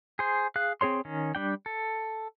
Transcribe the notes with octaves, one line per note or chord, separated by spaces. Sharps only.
G#4 C5
G#4 F5 F#6
C4 G#4 C#5 C6
D#3 C#4
G3 D4 G5
A4